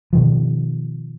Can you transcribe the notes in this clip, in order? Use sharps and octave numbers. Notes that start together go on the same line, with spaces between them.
B2 D#3 F3